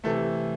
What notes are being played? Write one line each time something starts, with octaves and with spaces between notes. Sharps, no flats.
C3 E3 A3 A4